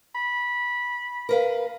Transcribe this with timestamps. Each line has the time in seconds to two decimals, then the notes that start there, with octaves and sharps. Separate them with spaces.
0.15 B5
1.29 A#4 B4 F5